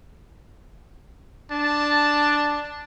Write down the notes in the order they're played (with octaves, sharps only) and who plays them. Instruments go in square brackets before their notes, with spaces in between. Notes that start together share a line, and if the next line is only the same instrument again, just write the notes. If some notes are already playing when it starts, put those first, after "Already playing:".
[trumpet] D4 [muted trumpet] A5